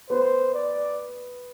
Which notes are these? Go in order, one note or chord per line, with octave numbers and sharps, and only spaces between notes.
B3 C5
D5